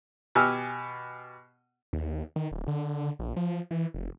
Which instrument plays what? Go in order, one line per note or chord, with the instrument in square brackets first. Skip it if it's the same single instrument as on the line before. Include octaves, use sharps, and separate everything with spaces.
[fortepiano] B2 G4 G#5 E6 F6
[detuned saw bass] D#2
D#3
D1
D3
A#1
F3
E3
F1